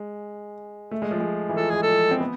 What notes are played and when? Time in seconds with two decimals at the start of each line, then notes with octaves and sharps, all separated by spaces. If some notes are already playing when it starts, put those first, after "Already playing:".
Already playing: G#3
0.91 A3
1.02 G#3
1.11 F3
1.20 G#3
1.49 E3
1.56 F3 A4
1.70 G#3 G#4
1.83 A4
1.88 F3
2.11 C4
2.20 B3